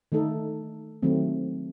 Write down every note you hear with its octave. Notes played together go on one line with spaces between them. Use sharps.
D#3 A3 D#4 A4
D#3 F#3 A3 C4